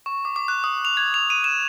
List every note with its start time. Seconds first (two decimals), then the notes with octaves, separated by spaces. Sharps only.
0.06 C#6
0.25 D6
0.36 D6
0.48 F#6
0.64 D#6
0.85 F7
0.97 G#6
1.14 F7
1.30 D#7
1.44 E7